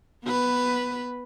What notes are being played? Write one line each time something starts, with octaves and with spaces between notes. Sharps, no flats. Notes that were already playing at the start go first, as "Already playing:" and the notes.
B3 B4